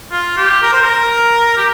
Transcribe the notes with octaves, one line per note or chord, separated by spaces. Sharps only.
F4
G4
A#4
C5
A#4
G4